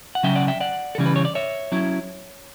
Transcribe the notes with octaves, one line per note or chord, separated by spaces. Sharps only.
F#5
C#3 F#3 C#4 E5 G5
D5 F#5
E5 G5
D5 F#5
A4
C#3 E3 G3 C#4 E4
B4
C#5
D5
C#5 E5
F#3 C#4 E4